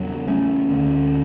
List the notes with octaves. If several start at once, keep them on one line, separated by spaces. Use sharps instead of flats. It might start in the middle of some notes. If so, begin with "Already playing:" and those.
Already playing: E2 C#3 F#3
A3 C#4
D2 D3